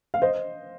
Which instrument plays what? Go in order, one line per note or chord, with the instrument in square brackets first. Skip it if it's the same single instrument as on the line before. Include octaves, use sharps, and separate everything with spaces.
[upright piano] F5
C5 D#5